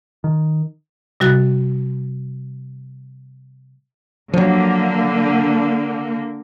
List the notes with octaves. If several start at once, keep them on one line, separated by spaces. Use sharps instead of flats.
D#3
C3 G3 F#4 F#6 A6
D3 F3 F#3 A#3